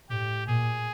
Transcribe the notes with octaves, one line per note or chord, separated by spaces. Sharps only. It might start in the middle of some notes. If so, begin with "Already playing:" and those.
A2 G4
A#2 G#4